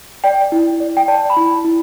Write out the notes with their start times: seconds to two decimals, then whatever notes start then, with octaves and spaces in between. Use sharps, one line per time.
0.24 D5 G5
0.52 E4
0.80 D5
0.97 G5
1.08 D5 A5
1.30 B5
1.36 E4
1.64 E4